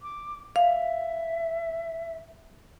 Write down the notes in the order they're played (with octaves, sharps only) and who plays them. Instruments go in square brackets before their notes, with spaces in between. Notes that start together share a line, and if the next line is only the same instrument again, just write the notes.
[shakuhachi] D6
[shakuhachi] E5 [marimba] F5